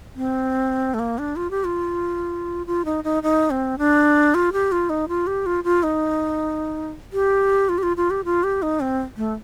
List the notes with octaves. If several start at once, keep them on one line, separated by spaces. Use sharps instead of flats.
C4
A3
A#3
D4
F4
G4
F4
F4
D#4
D#4
D#4
C4
D4
F4
G4
F4
D#4
F4
G4
F4
F4
D#4
G4
F4
G4
F4
F4
G4
F4
G4
D#4
C4
A3